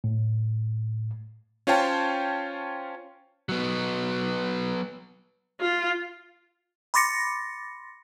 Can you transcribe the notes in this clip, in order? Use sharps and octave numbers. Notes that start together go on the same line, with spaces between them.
A2
C#4 F4 C5 C#5 G5 A5
F#3 B3
F4
B5 C6 D6 A6 A#6 C#7